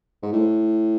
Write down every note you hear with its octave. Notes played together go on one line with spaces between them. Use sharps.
G#2
A2